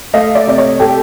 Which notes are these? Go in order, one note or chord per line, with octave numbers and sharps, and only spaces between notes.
A3 D#5 F5
D5 E5
C3 D5
C#5 D#5
G4 A4